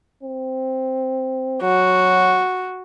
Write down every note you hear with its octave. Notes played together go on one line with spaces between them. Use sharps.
C4
F#3 F#4